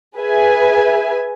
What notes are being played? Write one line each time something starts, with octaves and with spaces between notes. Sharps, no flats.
G#4 B4 E5 G#5